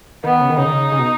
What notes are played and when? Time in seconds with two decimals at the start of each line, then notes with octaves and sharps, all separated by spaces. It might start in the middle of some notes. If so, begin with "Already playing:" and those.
0.24 D#3 B3
0.41 C#3
0.49 D#3
0.57 C#3 D#4
0.64 D#3
0.72 C#3
0.92 C#3
0.99 B2